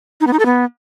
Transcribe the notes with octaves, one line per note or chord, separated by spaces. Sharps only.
D#4
B3
D#4
A4
B3